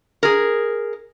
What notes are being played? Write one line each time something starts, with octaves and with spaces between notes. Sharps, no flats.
G#4 A#4